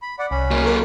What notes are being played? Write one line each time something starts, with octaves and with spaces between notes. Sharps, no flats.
B5
D5 F#5
C2 C#4 B5
F#3 A#3
A4 A#4